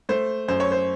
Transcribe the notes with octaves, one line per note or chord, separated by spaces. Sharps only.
A3 C5
F#2 C5
C#5
C5